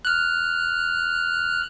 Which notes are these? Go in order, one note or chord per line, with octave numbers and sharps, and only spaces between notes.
F6 F#6